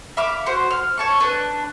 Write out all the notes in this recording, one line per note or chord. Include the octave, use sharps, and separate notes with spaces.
E5 F5 B5 D6
F#4 C5
F6
C#5 A5 C#6
D4 B4